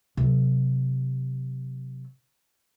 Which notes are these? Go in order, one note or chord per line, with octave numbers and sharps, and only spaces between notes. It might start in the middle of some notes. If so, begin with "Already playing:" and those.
C3 F#3